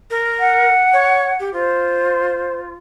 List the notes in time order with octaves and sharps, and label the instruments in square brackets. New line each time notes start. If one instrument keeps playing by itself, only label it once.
[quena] A#4
[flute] F#5
[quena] C#5
G4
[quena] F4 [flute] C5